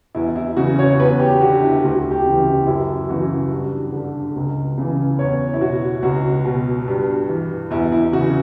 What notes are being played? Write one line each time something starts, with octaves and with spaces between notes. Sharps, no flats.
E2 E4
E4
C#3 E3 F#4
C#5
E2 B4
G4
D3 F#4
E4
D2 F#4
G4
C#3 E3
E4
F#2 E4
C#3 E3 F#4
G2
D3
C#2
C#3 E3
E2 C#5
E4
B2 F#4
C#2 F#4
B2
G2
E3
E2 E4
E4
C#3 E3 F#4